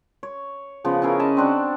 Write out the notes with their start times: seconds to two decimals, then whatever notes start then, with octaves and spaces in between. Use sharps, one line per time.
0.23 C#5
0.84 C#3 F3 B3
1.02 C#4 E4 G#4 A#4
1.19 D#5 A5 B5
1.37 C4 D4 F#4